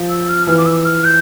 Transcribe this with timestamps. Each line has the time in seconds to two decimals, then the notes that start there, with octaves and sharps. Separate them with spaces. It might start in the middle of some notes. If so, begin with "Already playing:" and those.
Already playing: F3
0.10 E6
0.29 F6
0.47 E3 F6
0.57 D6
0.66 E6
0.85 F6
1.05 G6